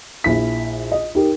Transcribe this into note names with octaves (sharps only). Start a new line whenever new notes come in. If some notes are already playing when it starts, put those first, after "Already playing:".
A#1 E4 B6
D#5
D#4 G4 A#4